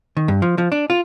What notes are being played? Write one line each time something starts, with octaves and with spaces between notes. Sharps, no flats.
D#3
G2
F3
F3
D4
F4